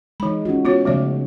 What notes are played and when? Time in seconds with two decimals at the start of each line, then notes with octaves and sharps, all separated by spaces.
0.20 E3 G#3 D#4 B5
0.45 C#4 F4 F#4
0.65 B3 F4 F#4 C#5
0.85 C#3 F3 G#3 A3 D5